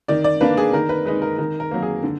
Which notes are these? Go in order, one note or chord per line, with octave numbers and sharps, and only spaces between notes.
D#3 D5
D5
A#3 D4 B4
G#4
D#3 A#4
B4
G#3 D#4 B4
A#4
D#3 A#4
A#4
F#3 A#3
G#4
D3